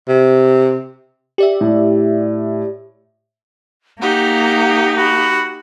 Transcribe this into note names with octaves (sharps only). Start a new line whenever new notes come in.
C3
G4 D5 E5
A2
A#3 D#4 G4 F#5
F#4 B5